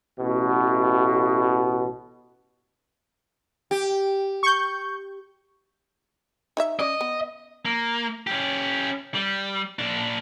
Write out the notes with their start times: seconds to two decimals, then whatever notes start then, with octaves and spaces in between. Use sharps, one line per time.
0.20 A1 B2
3.71 G4
4.43 C#6 G6
6.57 D#4 C#5 E5
6.80 C#4 D5 D#5
7.01 B3
7.66 A#3
8.27 C#4 G4
9.14 G3
9.79 A#2 D4